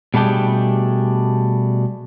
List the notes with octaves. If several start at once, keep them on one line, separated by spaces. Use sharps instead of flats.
B2 G3 A3 D4 G4 G#4